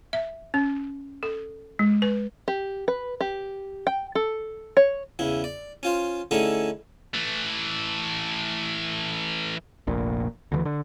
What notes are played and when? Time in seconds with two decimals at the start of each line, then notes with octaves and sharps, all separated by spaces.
0.13 E5
0.54 C#4
1.23 A4
1.79 G#3
2.02 B4
2.48 G4
2.88 B4
3.21 G4
3.87 G5
4.15 A4
4.77 C#5
5.19 E2 C#3 E4
5.44 D5
5.83 C#4 F4 C5
6.31 D3 A3 C#4 D#4 E4 G#4
7.15 E3 A3
9.87 F1 A#1 A#2
10.52 D2 C#3 E3
10.65 D3